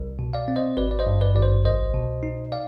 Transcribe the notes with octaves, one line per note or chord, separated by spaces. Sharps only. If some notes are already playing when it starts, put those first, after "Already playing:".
Already playing: C2
B2
D5 F5
C4
C5 D#5
G#1 B4 D5
D5
C5 D#5
G2
B4 D5
G#1 D5
C5
C2 C5 D#5
B2
D#4
D5 F5